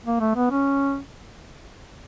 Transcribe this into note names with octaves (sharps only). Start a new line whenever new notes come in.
A#3
A3
B3
C#4